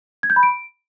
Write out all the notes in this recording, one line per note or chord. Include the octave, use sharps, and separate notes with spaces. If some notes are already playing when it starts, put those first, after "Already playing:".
G#6
G6
B5
D7